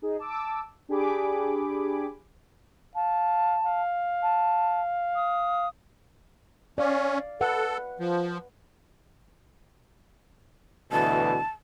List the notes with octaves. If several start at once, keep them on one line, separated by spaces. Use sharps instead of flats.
D#4 G#4
A5 D6 E6
D4 G4 G#4 G#5 B5 D6
F5 A5
F5
A5
D#6
C#4 D5 F5
A4 B4 F#5
F3
D2 B2 E3 A5